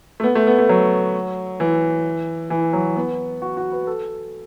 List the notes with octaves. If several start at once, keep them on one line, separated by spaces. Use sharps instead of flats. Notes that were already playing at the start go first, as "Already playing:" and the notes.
A3
B3
A3
B3
A3
F#3
E3
E3
F#3
B3
F#4
F#4
B4
A4